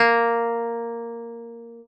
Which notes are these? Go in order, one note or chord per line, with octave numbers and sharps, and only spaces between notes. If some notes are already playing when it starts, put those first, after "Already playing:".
Already playing: A#3